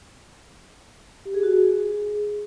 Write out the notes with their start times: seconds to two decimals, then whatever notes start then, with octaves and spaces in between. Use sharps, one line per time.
1.25 G4
1.34 G#4
1.43 F#4
1.52 G#4